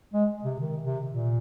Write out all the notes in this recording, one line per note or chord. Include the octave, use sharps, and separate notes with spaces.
G#3
C3
D#3
C3
A#2